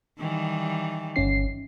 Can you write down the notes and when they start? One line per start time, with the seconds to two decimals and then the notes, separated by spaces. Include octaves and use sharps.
0.19 D#3 E3 G3
1.16 G1 C#4 C7